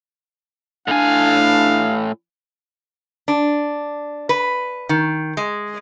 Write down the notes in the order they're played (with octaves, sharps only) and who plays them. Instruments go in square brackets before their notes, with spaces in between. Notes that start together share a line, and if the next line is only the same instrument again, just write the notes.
[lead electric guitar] A2 G#5 [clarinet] D4 [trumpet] F5
[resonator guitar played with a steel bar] D4
B4
D#3
G#3